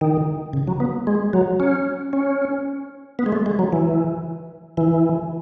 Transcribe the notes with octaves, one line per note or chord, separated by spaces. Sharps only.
D#3
C#3
F#3
B3
G#3
F#3
C#4
C#4
B3
G#3
A3
G#3
F#3
E3
E3